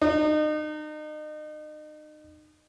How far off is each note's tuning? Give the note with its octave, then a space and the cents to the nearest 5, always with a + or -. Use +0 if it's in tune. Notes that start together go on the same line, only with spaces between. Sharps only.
D#4 -35